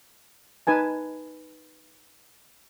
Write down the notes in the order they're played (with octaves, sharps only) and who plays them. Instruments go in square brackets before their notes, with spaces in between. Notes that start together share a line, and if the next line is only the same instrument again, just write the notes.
[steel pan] D#4 B4 G#5 A5